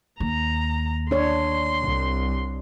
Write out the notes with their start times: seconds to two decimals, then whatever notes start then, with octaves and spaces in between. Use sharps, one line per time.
0.20 D#2 A#5
1.11 D4 C#5 C6
1.81 C2